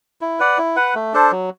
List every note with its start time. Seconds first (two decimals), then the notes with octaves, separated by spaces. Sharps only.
0.21 E4
0.39 B4 D5 F#5
0.58 E4
0.76 B4 F#5
0.95 A3
1.14 D4 A4 C5
1.31 F#3